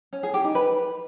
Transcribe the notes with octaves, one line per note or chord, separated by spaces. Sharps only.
C#4
G#4
G4
D#4
B4